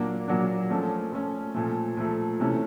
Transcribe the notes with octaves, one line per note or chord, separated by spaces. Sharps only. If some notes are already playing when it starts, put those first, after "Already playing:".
Already playing: A#2 F#3 A#3 D4
A#2 F#3 A#3 D4
F3 A3 C#4
F3 A3 C#4
A#2 F3 A3
A#2 F3 A3
C3 E3 A3 C#4